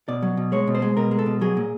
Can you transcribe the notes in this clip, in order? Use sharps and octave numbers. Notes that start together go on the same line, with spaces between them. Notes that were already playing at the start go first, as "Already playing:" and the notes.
B2 D5
F#3
B2
G#3 C#5
B2
C5
G#3
B2 A#4
G#3
A4
B2
F#3 G#4
A#2